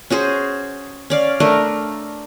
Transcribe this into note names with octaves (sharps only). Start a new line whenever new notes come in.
C#4 F#4 G#4 C5
C#4 D5 F5
A3 D4 A#4